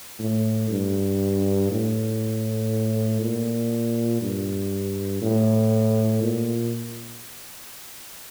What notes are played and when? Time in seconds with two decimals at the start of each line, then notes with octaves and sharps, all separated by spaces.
0.20 A2
0.70 G2
1.71 A2
3.21 A#2
4.21 G2
5.21 A2
6.22 A#2